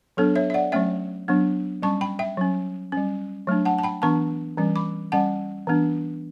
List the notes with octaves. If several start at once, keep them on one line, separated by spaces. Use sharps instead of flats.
F#3 B3 D4 A4 C#5
C#5 E5
E5
D5 F#5
F#3 A3 C#4 E5 G5
F#3 B3 D4
G3 C#4 A5 C#6
G5 B5
E5 G5
F#3 C#4
G3 C#4
F#3 A3 D4
F#5 A5
A5
G5 B5
E3 B3 D4 A5 C#6
E3 G3 C#4
B5 D6
G3 C#4 F#5 A5
E3 B3 D4